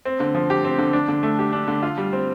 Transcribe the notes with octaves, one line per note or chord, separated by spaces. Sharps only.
C4
D3
F3
G4
C4
D3
D4
D3
A3
G4
D4
D3
F4
G3
C4